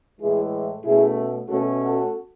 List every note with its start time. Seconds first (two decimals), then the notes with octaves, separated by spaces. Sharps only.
0.21 A2 E3 G#3 E4 G#4
0.85 B2 A3 C#4 E4 G#4
1.49 B2 A3 C#4 F#4 A4
1.80 F#4 A4